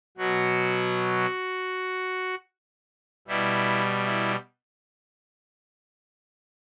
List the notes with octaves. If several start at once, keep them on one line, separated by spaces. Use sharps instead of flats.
B2 F#3 F#4
B2 G3 E4
E4